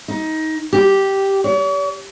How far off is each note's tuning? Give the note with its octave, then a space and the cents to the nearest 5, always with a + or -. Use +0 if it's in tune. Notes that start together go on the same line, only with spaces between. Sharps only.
D#4 +20
G4 -5
C#5 +45